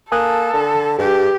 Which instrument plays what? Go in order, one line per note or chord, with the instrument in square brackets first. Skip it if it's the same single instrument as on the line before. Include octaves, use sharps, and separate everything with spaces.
[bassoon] A#3 [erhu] A4 [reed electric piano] G#5 D#6 F#6
[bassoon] D3
[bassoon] G2 [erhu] G4 [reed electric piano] G#4